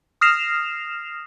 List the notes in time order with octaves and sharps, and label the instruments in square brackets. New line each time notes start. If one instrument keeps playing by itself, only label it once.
[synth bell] D#6 F6 A#6 C7 E7 F7